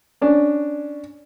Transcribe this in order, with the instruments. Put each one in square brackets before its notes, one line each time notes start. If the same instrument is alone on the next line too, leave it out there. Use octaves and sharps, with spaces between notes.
[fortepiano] C#4 D4